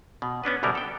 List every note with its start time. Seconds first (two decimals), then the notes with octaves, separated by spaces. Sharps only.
0.22 B2
0.44 B3 C#4 D4 B4
0.63 D2 B2 F#3 G3 A#4
0.75 A4 G5